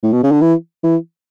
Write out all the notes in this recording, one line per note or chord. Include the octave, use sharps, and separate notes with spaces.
A2
B2
C#3
D3
E3
E3